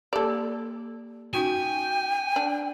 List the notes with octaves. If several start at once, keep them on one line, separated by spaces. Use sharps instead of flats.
A#3 G4 A4 D5
C#4 D#4 F#4 G5 G#5
D4